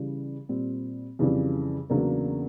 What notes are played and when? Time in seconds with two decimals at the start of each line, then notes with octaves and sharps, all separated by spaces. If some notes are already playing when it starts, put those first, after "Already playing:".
Already playing: C#3 E3 G3
0.49 A#2 G3 C4
1.19 F2 C#3 E3 G3
1.90 E2 C#3 F#3 A#3 D4